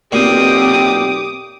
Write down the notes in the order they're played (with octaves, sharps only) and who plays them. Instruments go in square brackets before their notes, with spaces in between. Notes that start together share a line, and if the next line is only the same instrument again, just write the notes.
[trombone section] B1 G4 [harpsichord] A#2 [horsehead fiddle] C4 [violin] D6 D#6